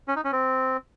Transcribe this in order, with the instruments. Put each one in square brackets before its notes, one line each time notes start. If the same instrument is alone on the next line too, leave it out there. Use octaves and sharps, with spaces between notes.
[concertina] C#4
D#4
C#4
C4